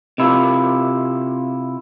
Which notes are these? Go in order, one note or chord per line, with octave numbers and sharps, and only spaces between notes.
C3 E4 F4